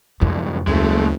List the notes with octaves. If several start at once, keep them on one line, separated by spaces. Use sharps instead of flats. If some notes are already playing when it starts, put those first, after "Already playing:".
C2 F2 G#2
F#1 D2 G#3 A3